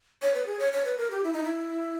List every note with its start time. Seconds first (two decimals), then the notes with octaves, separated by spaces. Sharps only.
0.22 C#5
0.34 B4
0.46 G#4
0.59 C#5
0.72 C#5
0.85 B4
0.98 A#4
1.11 G4
1.24 E4
1.33 D#4
1.44 E4